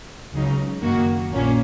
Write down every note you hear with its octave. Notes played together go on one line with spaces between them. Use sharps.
C#2 C#3 F#3 D#4
F#2 D#3 A#3 F#4
A#1 A#2 A#3 C#4